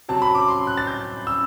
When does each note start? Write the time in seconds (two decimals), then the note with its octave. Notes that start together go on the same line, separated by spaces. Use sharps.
0.09 C3 F#3 C4 A5
0.22 B5
0.35 D6
0.48 C6
0.67 F#6
0.77 A6
0.87 G6
1.27 E6